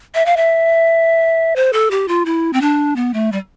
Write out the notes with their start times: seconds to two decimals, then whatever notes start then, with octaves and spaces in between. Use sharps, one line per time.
0.15 E5
0.26 F5
0.37 E5
1.56 C5
1.73 A4
1.91 G4
2.08 F4
2.25 E4
2.53 C4
2.61 D4
2.96 B3
3.14 A3
3.32 G3